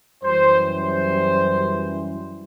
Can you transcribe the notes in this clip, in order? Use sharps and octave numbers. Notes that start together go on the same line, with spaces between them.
F#2 E3 G3 C5
C5